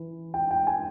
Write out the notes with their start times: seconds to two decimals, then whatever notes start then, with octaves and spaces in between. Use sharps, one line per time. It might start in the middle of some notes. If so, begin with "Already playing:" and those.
Already playing: E3
0.34 G5
0.51 G5
0.67 G#5